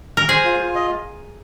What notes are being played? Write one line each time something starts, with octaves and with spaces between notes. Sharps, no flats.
A#4
G#4 C5
F4
F4
D#5